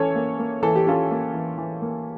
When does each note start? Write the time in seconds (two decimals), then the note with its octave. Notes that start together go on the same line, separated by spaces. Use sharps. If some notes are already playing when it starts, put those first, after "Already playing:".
Already playing: E3 C#4 A4 C#5
0.15 A#3
0.39 A#3
0.63 E3 A4
0.75 G4
0.87 C#4 F4 A4
1.11 A#3
1.34 E3
1.58 E3
1.82 A#3